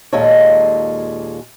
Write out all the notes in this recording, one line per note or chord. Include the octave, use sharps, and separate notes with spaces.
D#2 A#2 G#3 A4 C#5